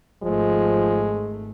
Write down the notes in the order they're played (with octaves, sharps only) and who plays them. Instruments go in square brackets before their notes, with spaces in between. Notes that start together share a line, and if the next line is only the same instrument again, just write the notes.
[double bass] G#1 A3 [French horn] F3 [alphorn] G#3